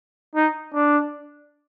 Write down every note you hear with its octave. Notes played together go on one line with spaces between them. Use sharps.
D#4
D4